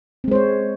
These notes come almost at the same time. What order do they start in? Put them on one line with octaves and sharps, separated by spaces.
C4 G#3 C5 C#5